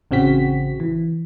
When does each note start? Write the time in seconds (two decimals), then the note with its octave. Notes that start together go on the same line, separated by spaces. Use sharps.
0.11 A1 C#3 C4 F#4 B6
0.80 E3